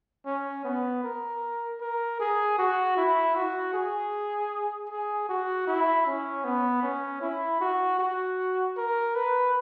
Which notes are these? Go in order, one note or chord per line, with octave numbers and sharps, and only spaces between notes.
C#4
B3
A#4
A#4
G#4
F#4
E4
F#4
G#4
G#4
F#4
E4
C#4
B3
C#4
E4
F#4
F#4
A#4
B4